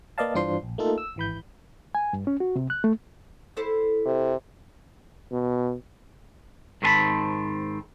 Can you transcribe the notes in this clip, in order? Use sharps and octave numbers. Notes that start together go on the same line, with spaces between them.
A#3 B4 D5 D#5 F5 A5
G2 E3 D4 F4 C5 C6
A#1
A3 A#3 D#4 F4 A4
E6
G#1 E3 B5 G6
G#5
G2
C#4
F#4
C3
F#6
A3
E4 A4 C5
C3
B2
G#2 D#3 C4 B4 A5 B5